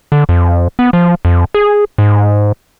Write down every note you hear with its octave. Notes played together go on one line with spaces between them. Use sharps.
D3
F2
B3
F3
F2
G#4
G#2